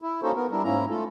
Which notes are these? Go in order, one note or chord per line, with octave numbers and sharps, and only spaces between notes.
E4
A#3 C#4 D#4 F#4 A4 C5
B3 A#4
G3 D4 E4 A#4
G#2 A#3 C#4 E4 A#5
A3 F4 A4